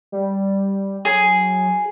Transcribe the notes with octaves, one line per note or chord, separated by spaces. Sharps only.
G3
F#3 G#4